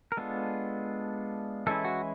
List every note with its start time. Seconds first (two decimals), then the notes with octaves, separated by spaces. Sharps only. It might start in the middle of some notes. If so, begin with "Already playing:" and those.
0.12 A#4
0.17 G#3 B3 D4 F4 A4
1.67 E3 G#3 C#4 E4 A4
1.85 F#4